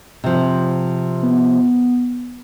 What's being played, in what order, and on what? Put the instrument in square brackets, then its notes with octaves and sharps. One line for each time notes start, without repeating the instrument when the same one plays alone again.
[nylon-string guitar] C3 F3
[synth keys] B3